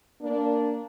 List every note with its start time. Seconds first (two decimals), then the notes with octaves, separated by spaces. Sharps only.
0.20 A#3 D4